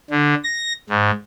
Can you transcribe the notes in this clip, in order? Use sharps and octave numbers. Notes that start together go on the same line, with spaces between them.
D3
A#6
G#2